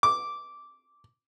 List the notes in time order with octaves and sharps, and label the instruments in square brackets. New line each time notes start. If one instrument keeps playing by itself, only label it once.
[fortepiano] D6